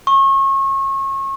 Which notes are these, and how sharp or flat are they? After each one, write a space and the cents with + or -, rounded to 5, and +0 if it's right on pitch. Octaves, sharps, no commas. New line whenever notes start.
C#6 -30